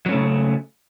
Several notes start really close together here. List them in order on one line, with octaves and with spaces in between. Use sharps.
F#3 C#4 A3 C#3